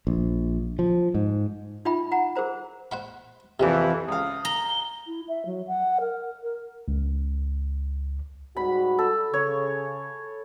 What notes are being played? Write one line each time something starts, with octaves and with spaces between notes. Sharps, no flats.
A#1
F3
G#2
D#4 F4 E5 G5 B5
F#5 A#5
G#4 A#4 C5 A#5
C5 F#5 B5
F2 C3 E3 G3 A#3
C#2 F5 D#6
A#5 G7
E4
E5
F#3
F#5
A#4
A#4
C#2
G#2 G3 F#4 B5
A4
C#3 C#5